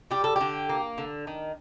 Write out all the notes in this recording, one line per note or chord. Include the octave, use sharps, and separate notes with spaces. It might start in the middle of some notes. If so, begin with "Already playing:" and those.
G3 G4
A4
D3 G4
A#3
D3
D#3